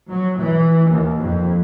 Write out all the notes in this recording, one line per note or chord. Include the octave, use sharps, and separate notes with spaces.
F#3
E3
D#2
F2